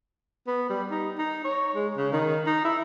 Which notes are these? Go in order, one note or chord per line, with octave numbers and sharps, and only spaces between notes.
B3
G3
D#4
D#4
C#5
G#3
C#3
D#3
D#4
E4